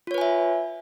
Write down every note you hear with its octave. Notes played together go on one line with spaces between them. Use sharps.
F4 B4 C#5 E5 G#5